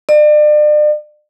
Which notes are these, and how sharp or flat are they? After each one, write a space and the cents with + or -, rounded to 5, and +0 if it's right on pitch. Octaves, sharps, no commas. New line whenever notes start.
D5 +35